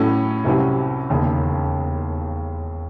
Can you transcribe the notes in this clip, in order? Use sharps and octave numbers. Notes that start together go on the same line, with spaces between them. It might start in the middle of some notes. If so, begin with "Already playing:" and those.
Already playing: A2 F#3 C#4 E4 A4
C2 C3 F#3 C#4 E4
E1 D#2 C#3